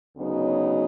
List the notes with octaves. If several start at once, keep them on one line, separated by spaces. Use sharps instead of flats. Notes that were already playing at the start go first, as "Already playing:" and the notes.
D2 C#3 F#3 B3 D#4